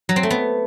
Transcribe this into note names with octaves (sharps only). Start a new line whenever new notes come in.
F#3
C4
A3
B3